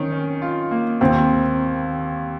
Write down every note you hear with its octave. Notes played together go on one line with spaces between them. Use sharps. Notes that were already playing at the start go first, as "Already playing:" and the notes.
Already playing: D#3 C4 C#4
C#4
F4
A#3
D#2 C4